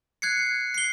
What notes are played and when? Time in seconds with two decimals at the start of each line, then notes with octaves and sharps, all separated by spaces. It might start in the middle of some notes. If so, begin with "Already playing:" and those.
0.22 F#6 G#6 C7 C#7
0.74 C7 G7